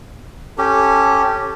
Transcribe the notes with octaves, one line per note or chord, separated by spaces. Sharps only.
C#4 G4 A4